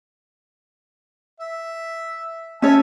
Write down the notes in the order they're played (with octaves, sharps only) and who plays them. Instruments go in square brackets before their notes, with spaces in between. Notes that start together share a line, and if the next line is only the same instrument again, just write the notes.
[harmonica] E5
[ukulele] C#4 C#5 [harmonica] E5 G#5 A5